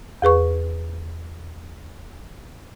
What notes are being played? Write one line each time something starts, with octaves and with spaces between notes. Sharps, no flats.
E2 G#4 B4 C#6